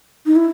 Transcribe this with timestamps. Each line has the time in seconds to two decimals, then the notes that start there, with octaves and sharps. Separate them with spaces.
0.26 D#4
0.36 E4